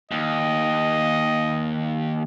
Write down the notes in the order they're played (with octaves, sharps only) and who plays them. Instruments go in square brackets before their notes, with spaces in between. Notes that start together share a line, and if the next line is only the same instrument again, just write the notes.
[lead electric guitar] D#2 [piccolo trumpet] D#5